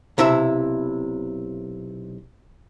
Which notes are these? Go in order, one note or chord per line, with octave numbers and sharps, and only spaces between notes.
B1 C3 E4 E5